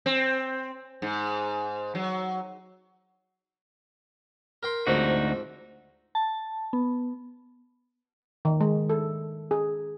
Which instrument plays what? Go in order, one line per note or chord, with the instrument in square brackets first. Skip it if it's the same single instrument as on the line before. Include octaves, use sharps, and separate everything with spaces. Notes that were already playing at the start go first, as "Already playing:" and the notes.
[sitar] C4
G#2
F#3
[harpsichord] A#4 G5 C6
[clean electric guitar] D2 D#4 F#4 [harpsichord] G#2 F3 C4
[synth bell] A5
B3
[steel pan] D#3
G#3
A4
G#4